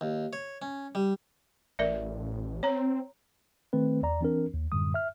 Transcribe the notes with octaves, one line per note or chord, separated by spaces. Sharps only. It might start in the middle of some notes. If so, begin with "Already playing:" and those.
D#2
C#5
C#4
G3
A1 A#4 D5 E5
C4 C#5 A#5
D#3 A3 C4 B4
E2 D5 A#5
E3 C4 D4 A#4
D#2
F#2 A2 D3 G3 D#6
E5 F6